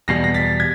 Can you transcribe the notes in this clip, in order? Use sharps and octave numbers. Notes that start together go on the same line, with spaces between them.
E2 B2 G3 A#6 C7
A#6
A6 B6
G#6